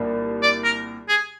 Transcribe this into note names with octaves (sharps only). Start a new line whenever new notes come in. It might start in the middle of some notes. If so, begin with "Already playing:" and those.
Already playing: C2 A#2 G3 A#3 D4
D5
A#4
G#4